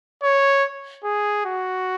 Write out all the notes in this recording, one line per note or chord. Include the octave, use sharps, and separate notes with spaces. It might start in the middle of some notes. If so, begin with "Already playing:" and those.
C#5
G#4
F#4